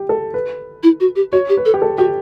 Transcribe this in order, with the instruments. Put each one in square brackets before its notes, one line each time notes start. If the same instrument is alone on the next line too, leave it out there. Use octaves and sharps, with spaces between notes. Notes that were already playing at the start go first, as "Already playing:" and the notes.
Already playing: [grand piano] G4
A4
B4
[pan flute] E4
F#4
G4
[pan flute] F#4 [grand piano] C#5
[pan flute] G4
[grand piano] B4
[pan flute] A4
[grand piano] G4
A4
[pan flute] F#4 [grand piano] G4